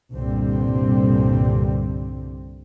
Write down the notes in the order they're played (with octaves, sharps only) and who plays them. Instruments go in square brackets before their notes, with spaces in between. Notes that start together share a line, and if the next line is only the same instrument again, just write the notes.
[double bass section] C2 G2 A#2 D3 G3 C4